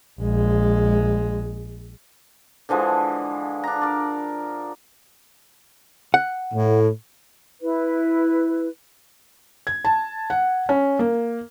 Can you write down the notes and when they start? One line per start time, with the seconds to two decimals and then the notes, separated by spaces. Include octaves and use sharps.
0.20 A#1 G#3
2.69 D3 E3 F3 G#3
3.64 D4 A#5
3.82 A#4 D5
6.14 F#5
6.54 A2
7.61 E4 B4
9.67 G#6
9.85 A5
10.30 F#5
10.69 C#4
10.99 A#3